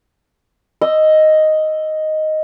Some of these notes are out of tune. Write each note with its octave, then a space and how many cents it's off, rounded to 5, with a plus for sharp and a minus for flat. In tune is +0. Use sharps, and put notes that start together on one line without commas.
D#5 +0 E6 +10